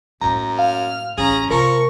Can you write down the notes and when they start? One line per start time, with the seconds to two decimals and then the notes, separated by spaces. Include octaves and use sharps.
0.21 F#2 A2 A#3 A#5
0.59 F5 F6
1.18 A1 D2 C#4 G#4 A#5
1.50 C3 F3 A3 A#4 C#6 C#7